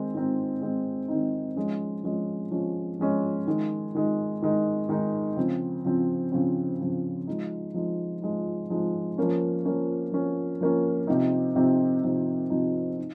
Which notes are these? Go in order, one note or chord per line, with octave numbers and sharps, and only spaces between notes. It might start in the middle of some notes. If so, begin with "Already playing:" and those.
Already playing: D#3 G#3 C4 D#4
D#3 G#3 C4 D#4
D#3 G#3 C4 D#4
D#3 G#3 C4 D#4
F3 G#3 C#4
F3 G#3 C#4
F3 G#3 C#4
F3 G#3 C#4
D#3 G#3 D#4
D#3 G#3 D#4
D#3 G#3 D#4
D#3 G#3 D#4
C#3 F3 C4
C#3 F3 C4
C#3 F3 C4
C#3 F3 C4
F3 G#3 D#4
F3 G#3 D#4
F3 G#3 D#4
F3 G#3 D#4
F3 A#3 C#4
F3 A#3 C#4
F3 A#3 C#4
F3 A#3 C#4
C3 F3 C4 D#4
C3 F3 C4 D#4
C3 F3 C4 D#4
C3 F3 C4 D#4
D#4